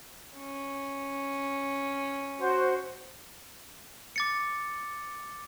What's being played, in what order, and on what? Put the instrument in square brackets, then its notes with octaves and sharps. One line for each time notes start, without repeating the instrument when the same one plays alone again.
[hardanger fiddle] C#4
[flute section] F#4 C5
[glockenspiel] D6 A6 C#7